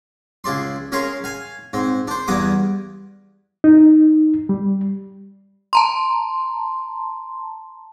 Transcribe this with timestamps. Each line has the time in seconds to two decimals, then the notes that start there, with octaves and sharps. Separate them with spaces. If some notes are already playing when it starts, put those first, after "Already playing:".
0.44 C#2 G#4 D5 C6
0.92 C#4 G#4 A#4 F5 C6
1.24 F5 G#5
1.73 G#2 C4
2.07 D4 C5
2.28 E2 G2 B3 D6 D#6
3.64 D#4
4.49 G3
5.73 A5 A#5 C6